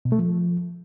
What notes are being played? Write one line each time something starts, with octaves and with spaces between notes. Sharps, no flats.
B2
A3
F3